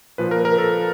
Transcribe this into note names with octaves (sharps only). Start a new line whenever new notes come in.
A#2 F3 B4
A#4
A#4
A4